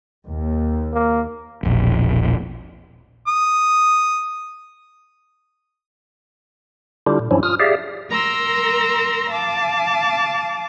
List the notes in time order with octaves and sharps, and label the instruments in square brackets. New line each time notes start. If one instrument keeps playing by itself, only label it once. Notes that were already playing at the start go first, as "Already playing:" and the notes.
[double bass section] D#2
[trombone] A#3
[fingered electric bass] E1 A#1
[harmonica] D#6
[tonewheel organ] D3 G3 D4 E4 F4 G4
A#2
G2 F3 F#3 C#4 D4 E4
F4 D#6 F6
G4 G#4 D5 E5 F5
[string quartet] A#4 A#5 C6 E6 A#6
F5 A5 D6